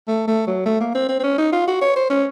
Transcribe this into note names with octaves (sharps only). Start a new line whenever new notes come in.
A3
A3
F#3
A3
A#3
C4
C4
C4
C#4
D#4
F4
F#4
C#5
C5
C#4